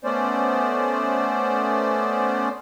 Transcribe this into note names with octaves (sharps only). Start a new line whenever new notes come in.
A3 B3 C#4 C5 D5